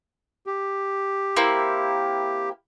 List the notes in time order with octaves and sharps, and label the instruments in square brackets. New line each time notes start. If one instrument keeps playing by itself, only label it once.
[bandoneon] G4
[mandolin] A#3 C4 E4